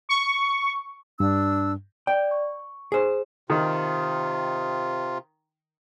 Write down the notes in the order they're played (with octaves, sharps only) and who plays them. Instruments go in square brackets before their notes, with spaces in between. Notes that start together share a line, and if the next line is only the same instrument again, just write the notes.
[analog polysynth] C#6
[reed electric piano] G2 [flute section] D4 E6
[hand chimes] D5 [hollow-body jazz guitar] G5
[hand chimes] C#6
[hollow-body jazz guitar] G#4 C5
[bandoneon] C3 F4 [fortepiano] D#3